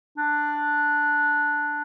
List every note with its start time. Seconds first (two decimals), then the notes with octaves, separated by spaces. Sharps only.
0.18 D4